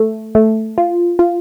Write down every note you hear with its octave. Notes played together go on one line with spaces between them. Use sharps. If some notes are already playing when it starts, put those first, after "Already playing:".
Already playing: A3
A3
F4
F4